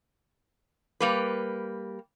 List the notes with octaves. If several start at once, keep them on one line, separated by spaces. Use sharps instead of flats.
G3 A#3 B4